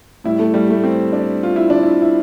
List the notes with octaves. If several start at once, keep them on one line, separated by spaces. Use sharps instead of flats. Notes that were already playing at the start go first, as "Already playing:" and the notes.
A2 G3 E4
A3
G3
A3
C4
D4
F4
E4
D4
E4
E4